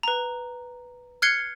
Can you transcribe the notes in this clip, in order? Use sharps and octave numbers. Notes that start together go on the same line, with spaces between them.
B4 A#5
F6 F#6 G#6 C7 C#7 G7